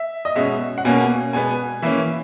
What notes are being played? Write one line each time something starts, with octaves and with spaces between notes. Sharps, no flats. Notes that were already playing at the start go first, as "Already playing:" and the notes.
Already playing: E5
D#5
B2 G#3 C#4 E5
F#5
B2 A#3 C#4 G#5
B2 G#3 B3 G#5
E3 A#3 C#4 E5